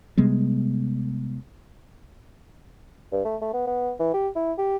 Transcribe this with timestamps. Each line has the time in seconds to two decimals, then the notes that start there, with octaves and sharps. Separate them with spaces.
0.18 C3 G3 G#3 B3
3.12 G2
3.25 A3
3.42 A3
3.54 B3
3.67 B3
4.00 E3
4.14 G4
4.36 E4
4.58 G4